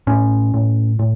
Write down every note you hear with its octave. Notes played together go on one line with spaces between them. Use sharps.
A2 C#4
A2
A2